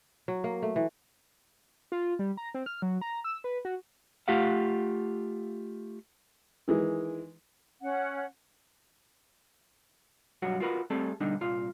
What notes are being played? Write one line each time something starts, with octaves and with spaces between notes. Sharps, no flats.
F#3
A#3
A3
E3
F4
G3
A#5
C4
F6
F#3
A#5
E6
B4
F#4
A3 F4 G4 F5 F#5
D#3 E3 G#3
C#4 F#5
G2 B2 F#3 F#4 F#5
F4 F#4 A#4 B4
G3 A3 C4 G#4 A4
B2 D3 G3 D4 D#4
C2 A#2 F4 F5